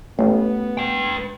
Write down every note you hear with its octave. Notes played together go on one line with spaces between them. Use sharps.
A1 A3 B3
B4 G5